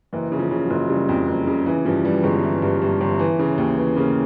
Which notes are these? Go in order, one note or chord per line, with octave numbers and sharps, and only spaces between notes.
F#1 E3
C#3
F3
C#3
F#3
F#1
C#3 G3
F2
F#1
C#3
E3
G2 F3
E3 G3
G1 G#3
E3
G2
G2
G1
E3
C#3
D#2
E3
C#3 A#3